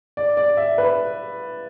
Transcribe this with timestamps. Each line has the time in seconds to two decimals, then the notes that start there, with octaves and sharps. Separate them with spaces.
0.17 D5
0.37 D5
0.57 E5
0.78 B4